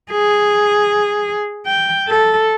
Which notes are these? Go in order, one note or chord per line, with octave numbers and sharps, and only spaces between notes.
G#4
G5
A4